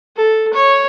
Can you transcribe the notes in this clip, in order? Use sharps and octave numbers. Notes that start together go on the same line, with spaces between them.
A4
C#5